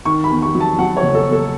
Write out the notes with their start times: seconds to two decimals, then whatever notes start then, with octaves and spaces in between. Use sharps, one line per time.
0.05 D#3 C#6
0.24 B5
0.30 E2
0.42 C#6
0.55 F#3
0.60 A5
0.79 F#3 F#5
0.97 C#5
1.03 F#1
1.15 A4
1.27 E2
1.32 A4